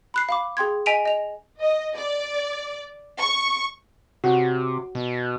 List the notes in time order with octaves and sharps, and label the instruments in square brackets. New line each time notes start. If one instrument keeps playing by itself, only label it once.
[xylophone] B5 F#6 C7
F5 B5 D6
G#4 G5 C6 G#6
D#5 G#5 B6 D7 D#7 F7
D#5 F7
[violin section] D#5
D5
C#6
[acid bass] C3 [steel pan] F#4
[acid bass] B2